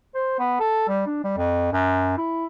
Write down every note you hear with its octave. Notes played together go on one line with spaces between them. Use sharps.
C5
B3
A4
G3
D4
G3
F2
F#2
E4